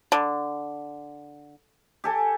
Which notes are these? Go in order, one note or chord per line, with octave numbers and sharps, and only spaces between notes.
D3
G4 A4 G#5